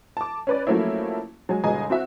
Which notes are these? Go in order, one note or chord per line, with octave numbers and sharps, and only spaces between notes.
A5 D6
C#4 B4 D5
F3 F#3 A3 A#3 C#4 E4
F#3 G#3 G#5
G1 B2 G#3 D#5 G#5 A#5
C4 F#4 E5